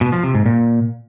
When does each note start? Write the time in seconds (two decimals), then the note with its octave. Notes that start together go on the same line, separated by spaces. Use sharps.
0.01 B2
0.12 F3
0.23 C3
0.35 G#2
0.46 A#2